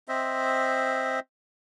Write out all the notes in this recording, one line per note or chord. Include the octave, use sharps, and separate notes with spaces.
C4 C5 D#5 E5